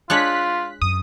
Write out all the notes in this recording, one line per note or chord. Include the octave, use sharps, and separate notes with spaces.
G#3 D4 F4 C#5 F#6 B6
F#2 D#6